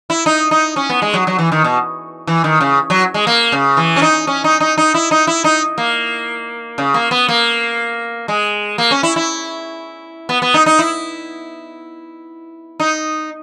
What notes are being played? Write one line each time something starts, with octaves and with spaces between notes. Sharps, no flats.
E4
D#4
D#4
C#4
B3
G#3
F#3
F#3
E3
D#3
B2
E3
D#3
C#3
F#3
G#3
A#3
C#3
E3
C#4
D#4
C#4
D#4
D#4
D#4
E4
D#4
E4
D#4
A#3
C#3
A#3
B3
A#3
G#3
A#3
C#4
E4
E4
B3
B3
D#4
D#4
E4
D#4